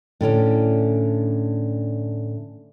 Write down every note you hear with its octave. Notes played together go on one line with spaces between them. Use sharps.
A2 D3 C#4 D4